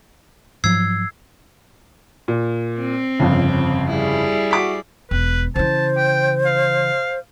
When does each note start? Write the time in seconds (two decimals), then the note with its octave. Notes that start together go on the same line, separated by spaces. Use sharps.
0.64 G#2 F3 F#3 E6 G#6 C7
2.28 A#2
2.79 C4
3.19 G1 F2 C#3
3.89 G3 E4 G#4
4.51 F#4 D6 B6
5.11 E1 B4
5.56 C#3 E3 C5 A5
5.97 G5
6.46 F5